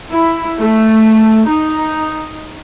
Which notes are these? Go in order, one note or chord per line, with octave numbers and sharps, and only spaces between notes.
E4
A3
D#4